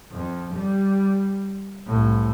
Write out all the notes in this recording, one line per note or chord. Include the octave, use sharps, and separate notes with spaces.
F2
G3
C2 A2